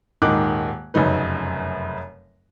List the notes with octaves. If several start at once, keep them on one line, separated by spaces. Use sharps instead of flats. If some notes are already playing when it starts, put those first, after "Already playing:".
D#1 G#2 D#3 D#4 D6 F#6
F1 F#2 C#3 F#3 D#4 B4